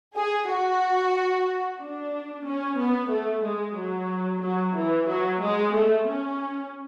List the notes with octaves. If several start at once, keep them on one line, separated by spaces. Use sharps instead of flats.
G#4
F#4
D4
C#4
B3
A3
G#3
F#3
F#3
E3
F#3
G#3
A3
C#4